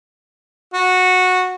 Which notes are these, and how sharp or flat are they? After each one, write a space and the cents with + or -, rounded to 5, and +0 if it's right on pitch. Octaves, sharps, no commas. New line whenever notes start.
F#4 -15